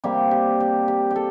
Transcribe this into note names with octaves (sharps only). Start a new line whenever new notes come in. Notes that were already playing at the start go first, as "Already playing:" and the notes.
C3 G3 A#3 G4
G4
G4
G4
G4
A4